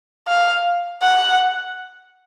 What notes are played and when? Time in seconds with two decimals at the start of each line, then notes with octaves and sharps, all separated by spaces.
0.28 F5
1.02 F#5